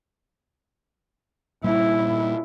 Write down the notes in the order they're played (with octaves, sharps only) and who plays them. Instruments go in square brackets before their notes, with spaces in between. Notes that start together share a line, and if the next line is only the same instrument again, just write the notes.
[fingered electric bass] A#2 G3 A#3 [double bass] E4